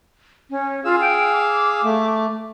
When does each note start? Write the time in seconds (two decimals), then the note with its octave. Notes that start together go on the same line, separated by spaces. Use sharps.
0.50 C#4
0.85 F4 G#4 F5 E6
1.01 G5
1.33 D6
1.84 A3